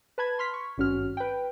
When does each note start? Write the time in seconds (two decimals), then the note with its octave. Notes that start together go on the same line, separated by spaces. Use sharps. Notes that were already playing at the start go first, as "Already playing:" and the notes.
0.18 B4 A5 B5 G#6
0.38 B5 C6 F6 B6
0.54 C#6
0.77 G#1 G2 C#4 F#4 F6
1.17 B4 G5